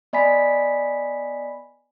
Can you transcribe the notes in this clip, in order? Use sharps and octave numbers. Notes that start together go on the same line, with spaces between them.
B3 D5 D#5 G#5 B5 B6